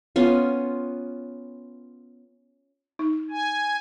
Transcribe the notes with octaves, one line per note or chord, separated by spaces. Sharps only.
B3 C#4 F4
D#4
G#5